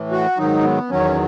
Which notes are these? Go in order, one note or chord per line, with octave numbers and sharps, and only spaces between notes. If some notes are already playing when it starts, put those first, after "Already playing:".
Already playing: A2 E3
F#4
G#2 D#3 F#3 D#4
B3
E2 D#3 F#3 C#4